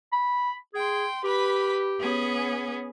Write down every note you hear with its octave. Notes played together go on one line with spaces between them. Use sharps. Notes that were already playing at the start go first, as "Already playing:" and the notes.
B5
G#4 G5 C6
G4 B4 B5
B3 C#4 G#4